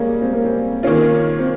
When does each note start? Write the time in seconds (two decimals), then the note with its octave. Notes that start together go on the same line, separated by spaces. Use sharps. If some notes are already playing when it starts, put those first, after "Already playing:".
Already playing: G3 G#3 A#3 C#4
0.21 C4
0.33 A#3
0.44 C4
0.83 D#3 A#3 C#4 F4
1.39 C4